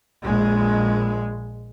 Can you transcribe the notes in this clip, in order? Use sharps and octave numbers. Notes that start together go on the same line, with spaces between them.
A#1 G#3